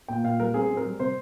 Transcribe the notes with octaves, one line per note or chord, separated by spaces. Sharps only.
A#2 G5
A#2 F5
G3 A#4
C4 G#4
C4
A#4
G3
C3 C5